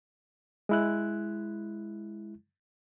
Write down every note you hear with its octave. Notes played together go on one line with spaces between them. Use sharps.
G#3 E4 F#6